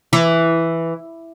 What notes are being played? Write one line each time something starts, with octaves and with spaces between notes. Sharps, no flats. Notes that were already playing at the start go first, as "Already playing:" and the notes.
E3